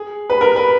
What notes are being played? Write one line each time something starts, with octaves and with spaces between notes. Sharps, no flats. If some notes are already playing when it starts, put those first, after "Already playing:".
Already playing: G#4
B4
A#4
B4